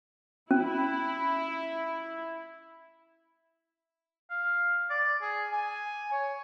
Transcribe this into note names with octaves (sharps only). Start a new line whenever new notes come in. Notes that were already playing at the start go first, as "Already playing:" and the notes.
C#4 E4
F5
D5
G#4
G#5
C#5